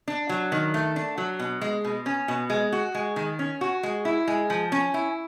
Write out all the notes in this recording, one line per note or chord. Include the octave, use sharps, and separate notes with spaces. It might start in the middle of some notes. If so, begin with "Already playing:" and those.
D4
F#3
D#3
A3
D4
F#3
B2
G#3
B2
C#4
B2
G#3
F#4
G#3
D#3
C#4
F#4
G#3
E4
G#3
F3
C#4
E4